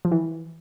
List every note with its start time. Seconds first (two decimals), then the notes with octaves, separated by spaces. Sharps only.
0.05 F3
0.12 E3